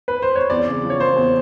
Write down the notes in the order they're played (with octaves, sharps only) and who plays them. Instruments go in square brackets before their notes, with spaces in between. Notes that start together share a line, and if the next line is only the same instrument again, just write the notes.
[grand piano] B4
C5
C#5
[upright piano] E2 [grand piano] D5
[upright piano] C#3
F3
[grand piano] C#5
[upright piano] A#3 [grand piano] C5
[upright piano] E2